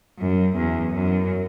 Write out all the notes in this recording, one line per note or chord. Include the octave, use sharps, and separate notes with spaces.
F#2
E2
F#2